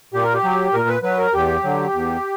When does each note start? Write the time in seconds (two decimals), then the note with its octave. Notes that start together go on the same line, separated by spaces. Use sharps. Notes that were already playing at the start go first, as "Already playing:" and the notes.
0.14 A#2 G4
0.23 A#4
0.34 G4
0.44 F#3
0.73 A#2 A#4
0.88 B4
1.03 F#3 B4
1.18 A#4
1.33 E2 G4
1.63 D3 F#3
1.93 E2